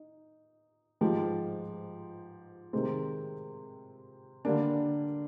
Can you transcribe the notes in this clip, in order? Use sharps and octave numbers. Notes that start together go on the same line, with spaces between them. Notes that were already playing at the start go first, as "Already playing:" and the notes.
Already playing: D#4
G#2 F3 G#3 D#4 G4
C3 D#3 G#3 C4
D3 G3 A#3 D4